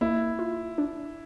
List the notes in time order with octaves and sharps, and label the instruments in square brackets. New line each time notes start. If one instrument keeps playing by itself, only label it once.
[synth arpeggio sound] A#3 [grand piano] E4
[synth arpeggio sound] F4
D4